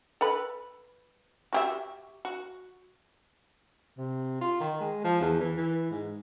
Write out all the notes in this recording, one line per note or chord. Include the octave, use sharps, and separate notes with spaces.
A4 B4 B5
F#4 G4 E5
F#4
C3
F4
D#3
G#3
F3
E2
E3
E3
G#2